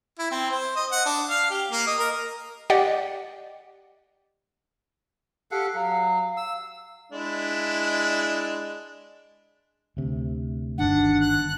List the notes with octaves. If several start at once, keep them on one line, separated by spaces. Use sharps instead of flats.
E4
C4
C5
D#5
F#5
D4
F5
G4
A#3
D#5
A#4
G4 D5 D#5 F#5 G5
G4 A4 F5 F#5
F#3 F5
E6
G#3 D4 E4
D2 C3
G1 G2 D#3 D4 F#5
F#6